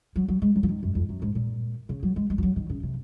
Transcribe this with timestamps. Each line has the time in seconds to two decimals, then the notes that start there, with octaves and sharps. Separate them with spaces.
0.16 F#3
0.28 F#3
0.42 G#3
0.56 F#3
0.63 F3
0.69 D#3
0.83 F#2
0.95 F2
1.09 F#2
1.22 G#2
1.35 A#2
1.89 C#3
2.03 F#3
2.16 G#3
2.30 G#3
2.38 F3
2.43 F#3
2.56 D#3
2.70 C#3
2.83 C3